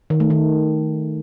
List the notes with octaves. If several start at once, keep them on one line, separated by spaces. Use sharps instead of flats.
D#3
A3
D#3